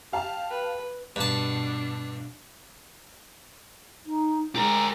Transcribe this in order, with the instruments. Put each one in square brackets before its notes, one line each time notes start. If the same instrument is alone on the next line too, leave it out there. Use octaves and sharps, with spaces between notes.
[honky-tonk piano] G4 F5 A5
[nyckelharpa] B4
[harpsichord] G2 A5 [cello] B2 D4
[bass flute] D#4
[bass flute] G#3 [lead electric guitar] G4 A#4